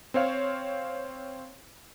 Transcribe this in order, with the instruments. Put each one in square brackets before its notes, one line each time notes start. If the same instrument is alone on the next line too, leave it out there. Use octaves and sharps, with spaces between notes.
[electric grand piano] C4 C5 C#5 F5